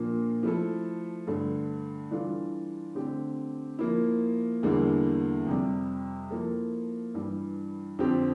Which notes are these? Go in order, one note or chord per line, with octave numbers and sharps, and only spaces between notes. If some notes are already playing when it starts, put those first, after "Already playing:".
Already playing: A#2 F3 A#3 D4
F3 A3 E4 A4
G2 D3 A3
E3 G3 D4 F4 A4
D3 A3 C4 G4
F3 A#3 E4
E2 D3 G3 A#3 E4
F2 C3 G3
F3 A#3 E4 A4
G2 E3 G3
F2 D3 F3 C4 G4